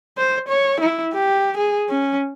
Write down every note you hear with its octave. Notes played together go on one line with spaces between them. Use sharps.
C5
C#5
E4
G4
G#4
C#4